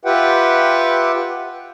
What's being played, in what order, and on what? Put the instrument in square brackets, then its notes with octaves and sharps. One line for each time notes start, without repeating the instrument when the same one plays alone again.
[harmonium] F4 G4 B4 E5 F#5 G5